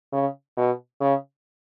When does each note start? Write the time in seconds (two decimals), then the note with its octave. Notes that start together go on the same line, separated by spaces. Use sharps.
0.13 C#3
0.57 B2
1.00 C#3